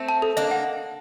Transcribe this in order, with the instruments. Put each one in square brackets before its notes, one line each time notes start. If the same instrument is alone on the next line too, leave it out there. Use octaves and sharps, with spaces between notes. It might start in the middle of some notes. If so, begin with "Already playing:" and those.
Already playing: [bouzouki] A3 C4
[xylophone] A5
A4
[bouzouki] A#3 D4 [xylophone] D#5
[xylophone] F#5